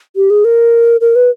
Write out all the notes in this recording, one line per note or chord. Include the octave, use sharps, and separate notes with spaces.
G4
G#4
A#4
A#4
B4